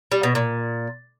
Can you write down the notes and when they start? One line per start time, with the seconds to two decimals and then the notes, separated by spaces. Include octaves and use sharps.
0.12 G3
0.23 B2
0.35 A#2